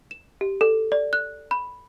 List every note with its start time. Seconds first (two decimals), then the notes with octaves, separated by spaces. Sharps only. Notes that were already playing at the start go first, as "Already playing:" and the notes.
0.11 E7
0.41 G4
0.61 A4
0.92 D5
1.13 F#6
1.51 B5